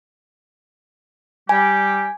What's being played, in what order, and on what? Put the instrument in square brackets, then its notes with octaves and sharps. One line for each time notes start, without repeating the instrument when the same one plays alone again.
[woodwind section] G3 G4 [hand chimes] G#5